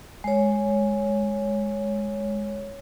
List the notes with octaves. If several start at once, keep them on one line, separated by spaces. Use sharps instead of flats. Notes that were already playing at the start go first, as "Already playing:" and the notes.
G#3 C#5